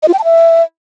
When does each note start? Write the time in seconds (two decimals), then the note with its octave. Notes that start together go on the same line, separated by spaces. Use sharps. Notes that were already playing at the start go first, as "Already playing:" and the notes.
0.03 D#5
0.08 F4
0.13 G5
0.19 A5
0.24 E5